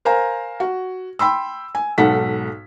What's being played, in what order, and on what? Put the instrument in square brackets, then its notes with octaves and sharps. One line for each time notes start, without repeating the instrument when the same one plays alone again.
[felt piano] A#4 C5 F5 G#5 A#5
F#4
G5 B5 C6 E6
G#5
B1 G#2 A4 F#5 B6